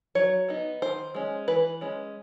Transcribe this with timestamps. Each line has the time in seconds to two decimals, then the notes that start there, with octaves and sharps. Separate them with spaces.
0.15 F#3 C#5
0.48 B3 D#4
0.82 D#3 C5
1.15 G#3 C#4
1.48 E3 B4
1.81 G#3 C#4